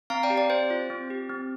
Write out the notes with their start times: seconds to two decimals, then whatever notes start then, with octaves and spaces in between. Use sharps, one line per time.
0.10 C4 F5 A#5
0.23 D5 G5
0.30 G4
0.37 D5
0.50 C4 C5
0.70 F4
0.90 C4
1.10 G4
1.29 C4